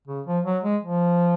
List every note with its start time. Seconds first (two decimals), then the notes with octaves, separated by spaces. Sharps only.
0.08 C#3
0.26 F3
0.45 F#3
0.64 G#3
0.82 F3